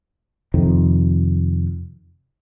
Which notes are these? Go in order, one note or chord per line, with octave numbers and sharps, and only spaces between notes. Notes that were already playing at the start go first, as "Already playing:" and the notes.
F2 C3 D#3